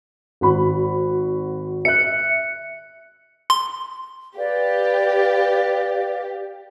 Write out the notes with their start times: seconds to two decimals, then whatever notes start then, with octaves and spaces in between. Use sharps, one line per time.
0.41 G#1 F#4 B5
1.85 E5 F#6 C#7
3.50 C6
4.37 G4 B4 D5 F5